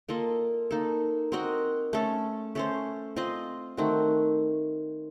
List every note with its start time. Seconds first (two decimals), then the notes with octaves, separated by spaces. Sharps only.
0.09 A#3 F4 A4 D#5
0.71 A#3 D#4 A4
1.32 C4 F#4 A#4 D#5
1.93 A3 C#4 A4
2.55 A3 C#4 A4 C5
3.16 C4 F4 C5 D#5
3.77 D#3 A3 C4 F#4